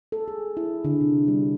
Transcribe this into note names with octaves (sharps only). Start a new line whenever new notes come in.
A4
G#4
E4
D3
C3
G3